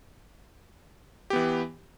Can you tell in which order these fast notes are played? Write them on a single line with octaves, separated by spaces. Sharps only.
G4 B3 E3